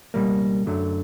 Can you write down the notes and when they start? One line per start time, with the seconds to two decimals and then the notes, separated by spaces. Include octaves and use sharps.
0.14 C#2 B2 G3 A#3
0.66 F#2 D3 F#3 A3